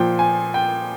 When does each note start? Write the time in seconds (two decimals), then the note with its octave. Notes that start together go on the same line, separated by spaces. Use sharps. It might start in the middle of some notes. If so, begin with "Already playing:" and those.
Already playing: A#2 F3 G5
0.19 G#5
0.54 G5